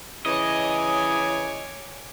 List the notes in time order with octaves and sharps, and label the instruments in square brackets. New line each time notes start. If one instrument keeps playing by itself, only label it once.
[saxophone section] C#3 E3 [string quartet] C#5 G#5 D6 [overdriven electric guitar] D#5